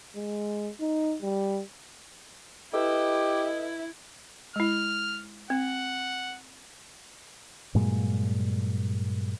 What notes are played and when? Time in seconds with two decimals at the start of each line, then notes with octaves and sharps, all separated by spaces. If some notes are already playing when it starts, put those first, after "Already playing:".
0.16 G#3
0.81 D#4
1.22 G3
2.74 E4 G4 A4 B4 D#5
4.56 G#3 E4 F6
5.50 C4 F#5
7.75 G2 A#2 F#3 G#3